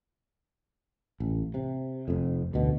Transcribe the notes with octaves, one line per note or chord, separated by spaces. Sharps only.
A1
C3
F1 F2
A1 D2 B2